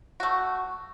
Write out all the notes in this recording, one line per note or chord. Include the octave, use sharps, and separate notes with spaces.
A3 F#4